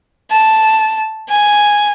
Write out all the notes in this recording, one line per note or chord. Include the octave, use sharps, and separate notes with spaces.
A5
G#5